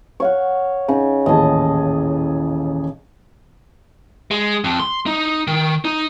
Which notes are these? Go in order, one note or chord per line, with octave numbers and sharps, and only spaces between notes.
C#5 F5 F#5
C#3 D#4
D#1 A1 G#4 D#5 A5
G#3
F2
C6
D#4
D#3
D#4